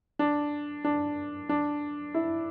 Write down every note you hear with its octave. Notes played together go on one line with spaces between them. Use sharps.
D4
D4
D4
E4